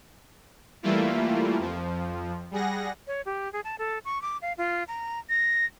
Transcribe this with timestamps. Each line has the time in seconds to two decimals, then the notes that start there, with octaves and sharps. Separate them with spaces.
0.83 E3 G3 A3 A#3 E4 F4
1.59 F2 F3
2.51 G3 G#4 F#5 A#6
3.07 C#5
3.26 G4
3.53 G#4
3.64 A5
3.79 A4
4.05 C#6
4.22 D6
4.42 F5
4.58 F4
4.88 A#5
5.29 A#6